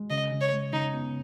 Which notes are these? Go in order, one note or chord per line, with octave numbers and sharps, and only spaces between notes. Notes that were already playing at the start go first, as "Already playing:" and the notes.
Already playing: G#3
C#3 D#5
C#3
C#5
G#3
C#3 D#4
B3